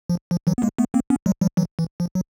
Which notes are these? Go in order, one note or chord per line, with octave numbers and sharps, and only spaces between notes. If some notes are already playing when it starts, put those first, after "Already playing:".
F3
F3
E3 F#3
B3
G#3 A#3
A3 B3
A#3 C4
B3 C#4
F#3 G#3
F3 G3
E3 F#3
E3
F3
F#3